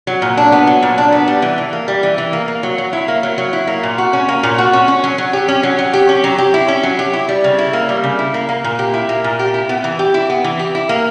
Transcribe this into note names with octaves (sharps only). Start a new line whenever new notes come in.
F#3
A#2
D4
B3
F#3
A#2
D4
B3
G3
E3
E3
A#3
G3
E3
E3
A#3
A#3
F#3
F#3
E4
A#3
F#3
F#3
E4
A#3
A#2
F#4
C#4
A#3
A#2
F#4
C#4
C#4
F#3
F#3
G4
C#4
F#3
F#3
G4
C#4
F#3
G4
E4
C#4
F#3
G4
E4
G3
C#3
E4
A#3
G3
C#3
E4
A#3
A#3
A#2
G4
E4
A#3
A#2
G4
E4
B3
E3
G4
E4
B3
E3
G4
E4
A#3